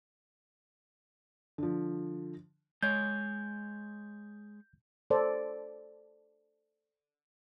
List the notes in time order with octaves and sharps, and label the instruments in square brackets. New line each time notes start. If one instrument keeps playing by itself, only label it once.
[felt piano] D3 F3
[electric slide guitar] G#3 C#5 [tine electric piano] G6
[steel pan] A4 C5 D5